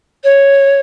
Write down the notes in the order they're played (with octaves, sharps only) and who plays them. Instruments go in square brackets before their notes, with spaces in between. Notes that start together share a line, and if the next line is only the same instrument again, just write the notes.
[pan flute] C#5